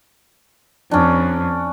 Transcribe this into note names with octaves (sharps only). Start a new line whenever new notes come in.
F2 C#4 D4